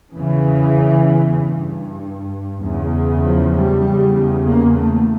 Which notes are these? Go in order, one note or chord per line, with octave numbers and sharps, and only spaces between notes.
E2 C#3 E3
G2
E2 C#3
F3
G3
E2 C#3
A#3
A3